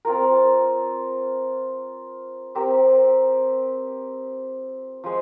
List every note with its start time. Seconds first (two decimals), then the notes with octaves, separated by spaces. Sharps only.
0.05 C4 F4 A#4
2.55 C4 G4 A#4 E5
5.04 F3 G#3